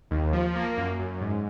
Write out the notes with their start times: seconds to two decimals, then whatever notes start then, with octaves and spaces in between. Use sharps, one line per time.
0.11 D#2
0.33 F3
0.55 A#3
0.78 F#2
0.99 F#2
1.21 G#2